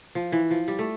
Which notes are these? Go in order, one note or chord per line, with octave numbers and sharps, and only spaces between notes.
F3
E3
F3
G3
A3